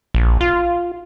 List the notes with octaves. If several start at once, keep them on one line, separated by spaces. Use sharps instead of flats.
A#1
F4